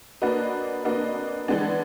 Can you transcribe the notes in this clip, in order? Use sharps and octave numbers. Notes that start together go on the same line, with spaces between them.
A#3 D4 F#4 B4 D#5
A#3 D4 F#4 B4 D#5
E3 G#3 B3 D4